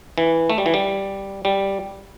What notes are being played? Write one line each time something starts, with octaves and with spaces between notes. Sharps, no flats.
E3
A3
G3
E3
G3
G3